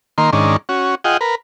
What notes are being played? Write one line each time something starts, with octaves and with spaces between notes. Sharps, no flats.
D#3 A#3 C6
G#2 D#3 C#4 D4
C#4 F#4
F4 G#4 D#5 F#5 G5
A#4 B4